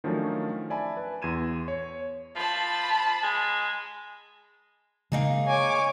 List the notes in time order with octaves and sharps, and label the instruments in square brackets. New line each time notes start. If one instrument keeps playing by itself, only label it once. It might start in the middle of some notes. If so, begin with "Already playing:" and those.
[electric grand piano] D#3 F3 F#3 A3 C#4 D4
D5 E5 G#5 A5 B5
B4
E2 C6 G#6 D#7 E7
C#5
[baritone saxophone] F3 [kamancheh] A5 B5
[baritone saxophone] G#3
[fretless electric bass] C#3 G#3 [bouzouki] A#3 D#4 G#4
[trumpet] C#5 [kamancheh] G#5 D6